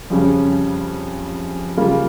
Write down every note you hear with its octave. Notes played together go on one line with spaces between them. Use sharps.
F2 C#3 G3 C#4
C#3 G3 A#3 F4 A#4